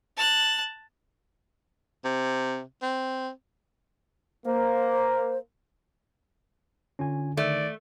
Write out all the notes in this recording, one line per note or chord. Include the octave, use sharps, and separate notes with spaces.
A5 F#6
C3
C4
A#3 C5
D3 C#4 F4 G#5
D#3 A3 D5